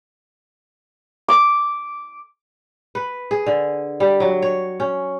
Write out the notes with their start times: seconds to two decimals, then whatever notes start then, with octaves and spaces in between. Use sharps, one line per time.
1.28 D6
2.95 B4
3.31 G#4
3.46 D3
4.00 G3
4.20 F#3
4.42 C#5
4.80 C#4